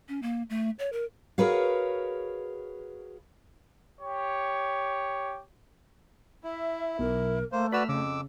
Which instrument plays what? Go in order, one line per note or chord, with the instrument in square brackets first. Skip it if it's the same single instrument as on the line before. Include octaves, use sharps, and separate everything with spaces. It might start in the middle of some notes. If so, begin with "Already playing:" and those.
[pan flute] C#4
A#3
A3
C#5
A#4
[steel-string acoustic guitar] F#4 G#4 A#4 B4 C#5 F5
[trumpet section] G4 C#5
[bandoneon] E4 [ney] E5
[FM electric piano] B1 [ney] A#4
[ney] A3 [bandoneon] A#3 C5
[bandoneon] F#4 B4 D5 [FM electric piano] B5 E6 F6
[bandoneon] F2 D6 E6 [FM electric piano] C#3